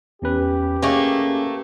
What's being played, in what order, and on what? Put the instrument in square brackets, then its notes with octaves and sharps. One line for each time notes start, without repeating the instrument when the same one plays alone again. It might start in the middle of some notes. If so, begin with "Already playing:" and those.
[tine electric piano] E2 C#4 B4 [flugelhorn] G4
[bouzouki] A3 A#3 [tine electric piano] C#4 G#4 B4